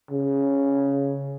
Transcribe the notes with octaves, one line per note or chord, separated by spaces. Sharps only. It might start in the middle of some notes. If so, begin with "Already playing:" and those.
C#3